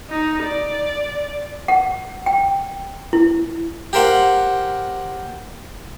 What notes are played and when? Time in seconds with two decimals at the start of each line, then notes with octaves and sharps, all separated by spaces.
0.10 D#4
0.43 D5
1.68 F#5
2.26 G5
3.13 E4
3.93 G4 A#4 C5 F5 F#5